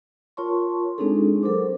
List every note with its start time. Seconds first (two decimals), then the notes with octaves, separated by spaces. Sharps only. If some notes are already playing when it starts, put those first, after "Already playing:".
0.37 F4 A#4 C#5 A5 C6 C#6
0.98 G#3 C4 D4 D#4 G#4 A4
1.43 F#3 A4 A#4 C5 D6